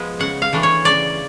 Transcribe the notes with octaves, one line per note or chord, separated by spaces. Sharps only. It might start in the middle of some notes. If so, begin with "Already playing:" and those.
Already playing: F3 G#3 B3
C#3 F#5
F5
E3 A3 D4
C#5
C#3 D5